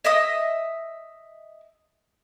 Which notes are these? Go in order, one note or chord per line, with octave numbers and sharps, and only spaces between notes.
D#5 E5 D#6